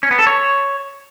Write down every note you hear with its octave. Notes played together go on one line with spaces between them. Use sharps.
C#4
B3
A4
C#5